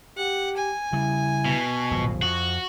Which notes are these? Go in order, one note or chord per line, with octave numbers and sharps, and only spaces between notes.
G4 F#5
G#5
C#3 G3 E4
B2
D#1 B1 G#2 F3
F2 F#4